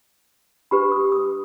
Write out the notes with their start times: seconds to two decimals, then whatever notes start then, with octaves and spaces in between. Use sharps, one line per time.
0.71 D4 G4 B4 B5
0.92 D#6
1.12 D#6